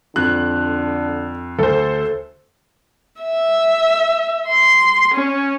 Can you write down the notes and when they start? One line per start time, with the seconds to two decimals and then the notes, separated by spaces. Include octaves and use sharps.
0.16 F2 D3 F#6
1.59 D2 A4 C5
3.21 E5
4.49 C6
5.14 C#4